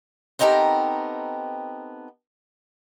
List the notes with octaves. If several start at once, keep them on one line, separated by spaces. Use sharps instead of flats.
B3 C4 D#4 G4 A4 A#4